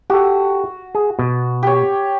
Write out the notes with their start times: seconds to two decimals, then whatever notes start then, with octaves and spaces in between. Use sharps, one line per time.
0.10 F#4 G4 A4
0.95 G#4
1.19 B2
1.63 G4 C#5